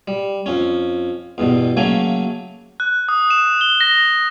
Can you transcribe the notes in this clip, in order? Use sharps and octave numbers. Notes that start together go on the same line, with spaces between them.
G3
F2 C#4
E2 G2 B2
C#3 F#3 A3 A#3 G#5
F#6
D#6
E7
G7
A#6